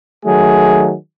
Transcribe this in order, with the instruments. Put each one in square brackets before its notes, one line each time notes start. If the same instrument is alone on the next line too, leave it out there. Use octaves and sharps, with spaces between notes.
[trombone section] D#3 F#3 A3 G#4